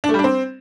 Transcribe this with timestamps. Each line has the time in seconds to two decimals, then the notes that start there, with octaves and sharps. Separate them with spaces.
0.04 D4
0.09 A3
0.14 G3
0.19 D4
0.24 C4